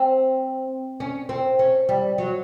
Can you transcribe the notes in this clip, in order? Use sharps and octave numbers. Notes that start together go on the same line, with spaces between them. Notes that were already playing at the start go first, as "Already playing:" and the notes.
Already playing: C4
C#4
C4
C#4
G3
F#3